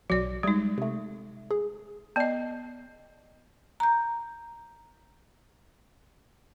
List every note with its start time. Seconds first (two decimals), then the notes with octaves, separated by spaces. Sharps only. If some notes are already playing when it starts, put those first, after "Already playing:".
0.10 B1 F#3 F#4 D5
0.43 G3 G#3 D#4 G#6
0.78 C3 A3
1.51 G#4
2.16 B3 D5 D#5 A5
3.80 A#5 G6